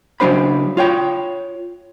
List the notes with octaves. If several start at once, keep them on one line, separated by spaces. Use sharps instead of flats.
C#3 F#3 C#4 D4 C5 B5
F4 C#5 G5